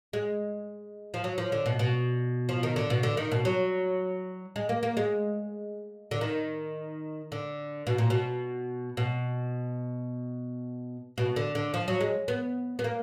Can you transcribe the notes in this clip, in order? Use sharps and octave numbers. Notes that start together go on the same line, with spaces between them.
G#3
F3
F#3
F3
D3
B2
B2
F3
D#3
D3
B2
D3
D#3
B2
F#3
G#3
A#3
A#3
G#3
D3
D#3
D3
B2
A#2
B2
B2
B2
D3
D3
F3
F#3
G#3
B3
B3
A#3